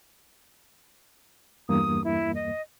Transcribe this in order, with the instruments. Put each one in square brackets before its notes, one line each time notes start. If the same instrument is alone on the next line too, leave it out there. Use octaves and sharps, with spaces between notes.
[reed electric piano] E2 G2 A#3 [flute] D#6
[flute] E4
D#5